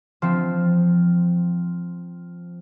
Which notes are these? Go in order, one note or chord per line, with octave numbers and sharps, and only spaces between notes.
F3 C4